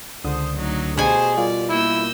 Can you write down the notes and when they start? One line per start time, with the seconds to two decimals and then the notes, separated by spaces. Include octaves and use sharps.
0.24 C#2 D3 C5 D#6
0.55 D2 F#3 D#4
0.98 B2 G4 G#4 C5 G#5
1.37 G3 F4 A#4 D5
1.69 A#3 E4 E6 G6